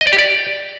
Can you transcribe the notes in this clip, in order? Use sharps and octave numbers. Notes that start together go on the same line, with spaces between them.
D#5
D5
G4
D5